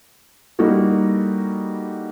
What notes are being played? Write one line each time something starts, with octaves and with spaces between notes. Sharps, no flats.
G3 A#3 D#4 E4 F#4 A4